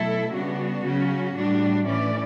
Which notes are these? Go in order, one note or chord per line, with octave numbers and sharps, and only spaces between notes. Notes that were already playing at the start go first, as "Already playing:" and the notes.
Already playing: B2 F#3 A3 E4 A4
C#3 G3 B3 D4 F#4
C#3 F#3 C#4
A2 G3 D4
A2 E3 A3 C#4 D5